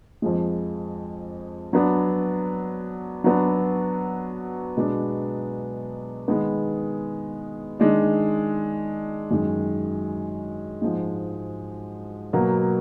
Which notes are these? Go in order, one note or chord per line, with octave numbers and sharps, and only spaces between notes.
F2 F3 G#3
F#3 B3 D4
F#3 B3 D4 F#4
B2 G#3 B3 D4
D#3 G#3 B3
D#3 G#3 D4
F#2 D#3 G#3
G#2 F3 G#3
B2 F#3 A#3